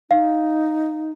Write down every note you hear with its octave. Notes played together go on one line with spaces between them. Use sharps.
D#4 F5